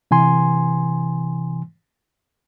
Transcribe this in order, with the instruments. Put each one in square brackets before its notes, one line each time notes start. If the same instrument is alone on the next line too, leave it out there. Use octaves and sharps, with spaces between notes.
[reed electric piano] C3 E3 G#5 C6